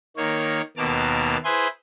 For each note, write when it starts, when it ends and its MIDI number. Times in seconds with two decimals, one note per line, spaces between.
0.17 0.61 51
0.17 0.61 58
0.17 0.61 73
0.77 1.37 39
0.77 1.37 47
0.77 1.37 58
0.77 1.37 81
0.77 1.37 86
0.77 1.37 89
1.44 1.67 64
1.44 1.67 68
1.44 1.67 71
1.44 1.67 72
1.44 1.67 80
1.44 1.67 84